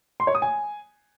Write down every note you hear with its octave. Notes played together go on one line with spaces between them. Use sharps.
C6
C#5
D#6
G#5